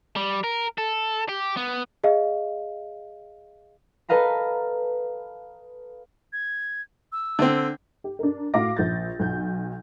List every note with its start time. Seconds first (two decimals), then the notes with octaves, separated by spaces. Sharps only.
0.16 G3
0.44 A#4
0.78 A4
1.29 G4
1.57 B3
2.04 G#4 D#5 F5
4.09 A4 B4 D#5 F5 A#5 B5
6.33 G#6
7.12 E6
7.39 D3 C4
8.04 G4
8.19 D4 A#4
8.54 A2 F#4 F5 D6 A#6
8.77 A#1 G6 A6
9.19 B1 G6